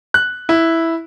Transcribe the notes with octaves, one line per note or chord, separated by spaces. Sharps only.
F#6
E4